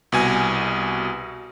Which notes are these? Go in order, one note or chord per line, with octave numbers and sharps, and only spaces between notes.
C2 B2 G#5